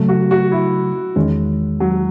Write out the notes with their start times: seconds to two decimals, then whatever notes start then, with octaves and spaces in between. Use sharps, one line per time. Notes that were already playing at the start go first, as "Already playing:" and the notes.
Already playing: C#3 F#3 A3
0.09 F#4
0.31 F#4
0.52 E4
1.16 E2 D#3 G#3 C#4
1.80 F#3